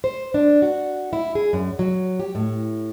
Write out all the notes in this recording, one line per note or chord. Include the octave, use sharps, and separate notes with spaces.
C5
D4
F#4
E4
G#4
F#2
F#3
G4
A2